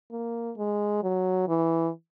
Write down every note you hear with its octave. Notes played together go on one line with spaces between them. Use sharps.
A#3
G#3
F#3
E3